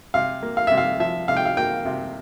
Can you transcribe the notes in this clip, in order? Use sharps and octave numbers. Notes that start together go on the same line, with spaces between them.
C3 F5
A#3
F5
C3 E5
F5
F3 E5
C3 F5
G5
F5
A#3 G5
C3